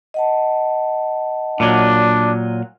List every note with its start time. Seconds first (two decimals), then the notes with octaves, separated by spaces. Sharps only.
0.14 D#5 F#5 A5
1.60 A#2 F#3 D4